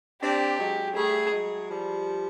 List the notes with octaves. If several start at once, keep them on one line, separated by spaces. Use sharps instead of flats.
C4 D4 G4
F#3 G#3
G3 A3 G#4
F#3 G#3
F3 G3